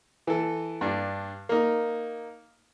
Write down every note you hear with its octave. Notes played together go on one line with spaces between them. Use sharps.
E3 A4
G2 D4
A#3 D#4